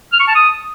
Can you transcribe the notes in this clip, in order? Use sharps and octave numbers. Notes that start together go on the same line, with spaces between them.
F6
C#6
A5
D#6